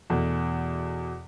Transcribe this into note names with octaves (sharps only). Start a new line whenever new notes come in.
E2 B2 A3